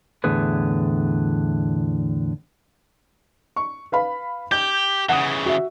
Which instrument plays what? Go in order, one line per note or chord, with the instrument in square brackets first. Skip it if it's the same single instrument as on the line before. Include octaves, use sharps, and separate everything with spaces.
[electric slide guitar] E2 A2 D3 G#4 B4
[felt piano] C#6
B4 F5 B5
[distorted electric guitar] G4 [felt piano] G6
[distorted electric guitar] C#3 E3 [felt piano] F#5 D#6
[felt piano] F#4 E5